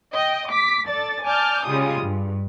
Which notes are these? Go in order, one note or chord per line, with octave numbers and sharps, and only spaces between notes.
D#5 G5
D6 B6
A4 D5 A6
D5 G#5 A5 D6 F6 G6
C#3 G3 G#3 F4 D#6
G2